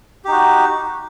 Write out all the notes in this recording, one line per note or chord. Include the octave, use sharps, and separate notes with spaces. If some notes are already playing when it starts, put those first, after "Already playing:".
D#4 F#4 G4